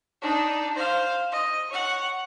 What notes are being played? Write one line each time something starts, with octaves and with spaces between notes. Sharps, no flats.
D4 D#4
C5 F5
D#5
C#5 F#5